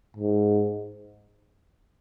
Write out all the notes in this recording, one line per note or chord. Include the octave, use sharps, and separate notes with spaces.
G#2